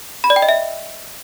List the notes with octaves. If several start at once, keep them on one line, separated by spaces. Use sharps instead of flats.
B5
D5
G5
D#5
E5